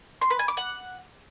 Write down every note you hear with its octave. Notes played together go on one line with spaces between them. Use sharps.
C6
B4
G#5
D6
F#5